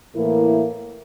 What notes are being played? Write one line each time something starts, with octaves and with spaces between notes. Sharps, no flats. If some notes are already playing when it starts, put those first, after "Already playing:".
A2 E3 A#3 E4 A#4